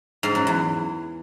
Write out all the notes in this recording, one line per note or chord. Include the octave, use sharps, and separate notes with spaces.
G#2
F#2
E2